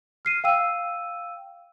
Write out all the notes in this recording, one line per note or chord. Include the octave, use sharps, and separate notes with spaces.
F6 C7 D#7
F5 G5 E6 D#7